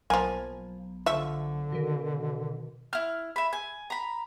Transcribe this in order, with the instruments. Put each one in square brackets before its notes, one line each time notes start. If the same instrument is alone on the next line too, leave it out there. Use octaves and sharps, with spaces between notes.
[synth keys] B1 [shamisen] F3 A#3 [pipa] G#5
[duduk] D3 [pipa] F3 F4 C#6 [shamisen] E5
[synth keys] B2 D#3
[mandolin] E4 F6
E5 B5
G#5
A#5 B5